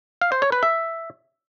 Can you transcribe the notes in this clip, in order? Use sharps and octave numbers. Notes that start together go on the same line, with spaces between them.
F5
C5
C#5
B4
E5